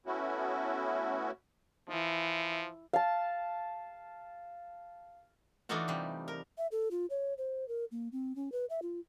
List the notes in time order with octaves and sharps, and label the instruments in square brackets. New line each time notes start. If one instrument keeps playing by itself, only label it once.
[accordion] A3 B3 C#4 E4 F#4
[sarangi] E3 [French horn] F3
[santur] F5 A5
[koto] E3 A3 D4 D#4 F4 F#4
C3 G3
A#4
[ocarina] E5
A4
F4
C#5
C5
A#4
A#3
C4
C#4
B4
E5
F4